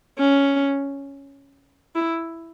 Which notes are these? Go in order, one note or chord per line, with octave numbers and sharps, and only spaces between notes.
C#4
E4